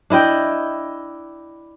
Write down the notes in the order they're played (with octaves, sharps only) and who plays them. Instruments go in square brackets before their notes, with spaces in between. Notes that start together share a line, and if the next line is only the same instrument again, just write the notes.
[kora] D4 E4 D#5 G5